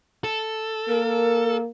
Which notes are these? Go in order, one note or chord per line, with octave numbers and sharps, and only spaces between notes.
A4
A#3 A#4